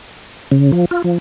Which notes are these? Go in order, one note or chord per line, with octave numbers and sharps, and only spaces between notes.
C#3
F3
F4
F3